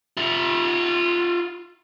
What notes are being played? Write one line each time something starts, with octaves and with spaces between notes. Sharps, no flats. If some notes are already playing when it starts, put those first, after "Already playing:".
F4 E5